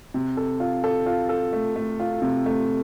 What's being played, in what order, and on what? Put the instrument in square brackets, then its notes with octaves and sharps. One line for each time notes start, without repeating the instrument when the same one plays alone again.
[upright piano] C3
A4
F4
A4
F4
A4
A3
A3
F4
C3
A3